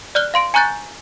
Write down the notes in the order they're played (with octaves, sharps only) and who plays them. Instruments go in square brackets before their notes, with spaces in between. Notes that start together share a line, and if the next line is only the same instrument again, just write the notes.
[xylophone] D5 F6 F#6 G7
F5 C6 D7
G#5 A#5 C#6 F#6 G6 A6